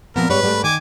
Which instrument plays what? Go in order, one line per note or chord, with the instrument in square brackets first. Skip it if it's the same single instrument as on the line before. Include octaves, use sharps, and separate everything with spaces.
[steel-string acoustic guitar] A#2 F3 C4 [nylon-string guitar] B3 [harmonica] A#4
[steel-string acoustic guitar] G#2 [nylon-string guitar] G3 C#5 [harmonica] B4
[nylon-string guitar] G3 A3 G4
[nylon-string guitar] D#3 [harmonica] G#5 D6